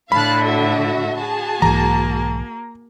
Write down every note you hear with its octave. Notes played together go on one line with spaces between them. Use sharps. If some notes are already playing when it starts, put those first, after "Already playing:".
A2 D3 F5 A5 B5 F#6
F#4 A4 E5
F#4 G#4 A5
B1 G#2 E3 A#3 A#5